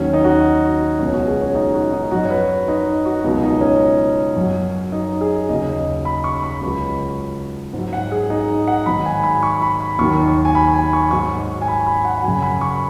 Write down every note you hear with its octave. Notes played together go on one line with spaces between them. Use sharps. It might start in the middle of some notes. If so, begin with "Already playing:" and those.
Already playing: D#2 D#3 F#3 C#4
D#4
F#4
C#2 B2 F#3 C#4
F#4
G#4
C#4
D#4
F#4
D#4
F#2 F#3 F#4
C#5
B4
D#4
F#4
C#2 B2 F#3 D#4
D#4
C#4
F#2 F#3
D#4
G#4
D#2 C#3 F#3 D#5
B5
C#6
B5
C#2 C#3 F#3
G#2 F#3
F#5
G#4
D#4
F#5
G#2 D#3 F#3 B5
G#5
B5
C#6
B5
B5
D#2 D#3 F#3 C#6
C#6
G#5
B5
G#5
C#6
G#2 F#3 C#6
G#5
B5
B5
F#5
F#5
F#2 C#3 F#3 G#5
B5
C#6